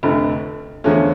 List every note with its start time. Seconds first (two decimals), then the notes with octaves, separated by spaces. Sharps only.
0.03 F1 F2 D3 A3
0.84 E2 D3 F3 A3 C#4